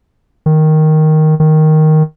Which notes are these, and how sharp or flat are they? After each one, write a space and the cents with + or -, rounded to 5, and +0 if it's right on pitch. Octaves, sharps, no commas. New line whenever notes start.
D#3 +0
D#3 +0